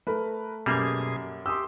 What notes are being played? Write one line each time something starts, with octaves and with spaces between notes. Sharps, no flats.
A3 A#4 B4
F#2 B2 G3 A#3 G#4
G4 C6 D#6 E6